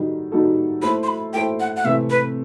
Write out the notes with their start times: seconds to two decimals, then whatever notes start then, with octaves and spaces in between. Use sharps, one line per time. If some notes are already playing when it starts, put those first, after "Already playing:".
Already playing: D#3 G3 D#4 F#4 A4
0.32 D#3 G3 D#4 F#4 A4
0.82 A3 E4 A4 C5 B5
1.03 C6
1.08 B5
1.33 A3 E4 A4 C5 G5
1.60 F#5
1.76 F#5
1.84 C3 E3 A3 C4 E5
2.10 B4